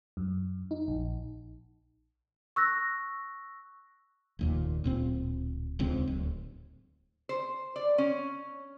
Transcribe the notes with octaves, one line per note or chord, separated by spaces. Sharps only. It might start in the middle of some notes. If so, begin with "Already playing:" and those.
F#2
D#4
A#1
C#6 E6 F#6 A#6
F1 D#2 A#2
D1 A#2 C4
D#1 C#2 G#2 C4
D1
C5
D5
C#4